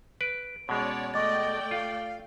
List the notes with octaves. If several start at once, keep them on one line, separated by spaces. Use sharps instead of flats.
B4 D7
B2 G#3 C#4 C#5 D5
A3 D5 D#5 G5 C#6 D6 A6
F4 F5